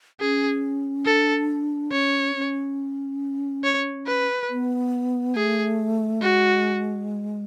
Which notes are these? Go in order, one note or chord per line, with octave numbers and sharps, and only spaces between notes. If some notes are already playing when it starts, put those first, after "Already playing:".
C#4 G#4
D4 A4
C#4 C#5
C#4
C#5
B4
B3
A3 G#4
G#3 F#4